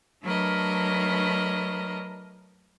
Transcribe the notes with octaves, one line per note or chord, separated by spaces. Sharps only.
F#3 A3 D4 A#4 B4 D#5